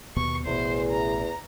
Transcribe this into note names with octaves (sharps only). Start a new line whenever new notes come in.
D#2 B2 B3 C#6
A1 E2 B2 C5
A#5